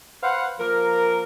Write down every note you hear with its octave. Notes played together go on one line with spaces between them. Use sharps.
B4 C5 F5 F#5
F3 A#3 A#4